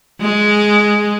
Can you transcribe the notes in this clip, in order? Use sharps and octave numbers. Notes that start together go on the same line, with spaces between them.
G#3